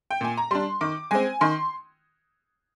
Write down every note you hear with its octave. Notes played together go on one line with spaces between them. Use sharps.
G5
A#2 G#5
A#5
G3 D4 C6
D#3 D6
G#3 C4 G#5
D#3 C6